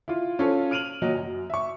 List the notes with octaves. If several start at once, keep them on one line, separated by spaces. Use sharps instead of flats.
E4 F4
C#4 F4 A4 C5 C#5
F6 D7 D#7 F7 F#7
A#2 F#3 D#5
F#2
E5 C#6